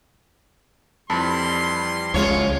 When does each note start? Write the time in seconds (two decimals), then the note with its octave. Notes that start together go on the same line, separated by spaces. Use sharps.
1.10 F2 E3 G3 A5 B5 C6
2.14 C#2 F#2 G#3 F4 C#5